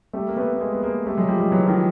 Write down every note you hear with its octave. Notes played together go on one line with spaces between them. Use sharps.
G3 A3
A#3
A3 B3
B3
G#3 A#3
B3
G#3 A#3
G3 A3
F#3 G#3
F3 G3
F#3 G#3
E3 F#3
D#3 F3